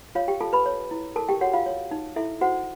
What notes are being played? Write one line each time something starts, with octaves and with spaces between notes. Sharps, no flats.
F4 C#5 F5
G4 G5
F4 A4 A5
B4 B5
C#5
E4
A4 A#4 A5
G4 G5
F#4 C#5 F#5
F4 F5
C#5
D#4
E4 A4 E5
F#4 C5 F#5